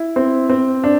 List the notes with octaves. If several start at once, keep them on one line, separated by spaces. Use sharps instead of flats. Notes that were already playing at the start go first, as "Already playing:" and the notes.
Already playing: E4
C4
C4
D4